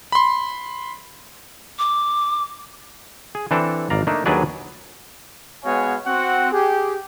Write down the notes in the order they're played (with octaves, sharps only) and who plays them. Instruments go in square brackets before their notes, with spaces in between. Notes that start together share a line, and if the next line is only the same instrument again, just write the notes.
[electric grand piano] B5 C6
[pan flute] D6
[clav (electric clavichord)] G#4
E3 C4 D4 A4
G#1 D5 F5 A#5
A3 A#3 D4 D#4
D#2 F#3 D4 G#4 B4 D5
[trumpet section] G#3 B3 F#4 C#5 F5 G#5
C4 F#4 F#5
G4 G#4